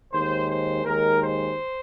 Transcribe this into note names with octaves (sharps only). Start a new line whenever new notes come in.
D#2 D#3 G#3 C5
C5
D#2 D#3 G#3 A#4
C5